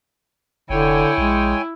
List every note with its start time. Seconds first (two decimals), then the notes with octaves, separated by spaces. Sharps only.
0.70 F1 D3 E4 C#5 G5 G#5
1.18 A#1 G#3